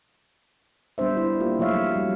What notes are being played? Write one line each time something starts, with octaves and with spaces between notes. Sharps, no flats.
G3 B3 D4 C5 E5
E4 C5
A#3 F4 G4
F3 A3 C#5 E5 F5
F#3
G3